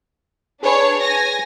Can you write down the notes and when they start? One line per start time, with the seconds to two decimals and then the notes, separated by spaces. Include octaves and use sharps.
0.63 D4 G#4 B4 C#5
1.03 G#5 A#6